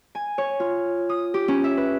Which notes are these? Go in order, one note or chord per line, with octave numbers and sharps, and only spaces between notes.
G#5
C#5
F4
D#6
G4
C#4
E5
B4